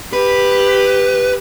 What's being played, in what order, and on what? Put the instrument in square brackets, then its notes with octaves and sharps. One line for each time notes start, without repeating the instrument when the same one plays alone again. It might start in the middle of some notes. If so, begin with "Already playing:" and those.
[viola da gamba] G4 [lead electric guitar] B4